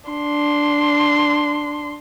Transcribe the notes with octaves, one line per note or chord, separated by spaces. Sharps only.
D4 C6